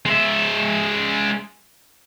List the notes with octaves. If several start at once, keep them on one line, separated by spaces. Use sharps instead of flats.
G#3 E5